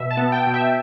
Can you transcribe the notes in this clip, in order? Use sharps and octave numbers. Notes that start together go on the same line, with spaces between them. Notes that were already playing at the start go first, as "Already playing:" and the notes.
Already playing: B2 E5
A5
B3
G5
B2
E5